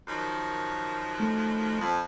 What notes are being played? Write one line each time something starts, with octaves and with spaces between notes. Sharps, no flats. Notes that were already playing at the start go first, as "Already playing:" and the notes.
F#2 D#3 F3
A3
F2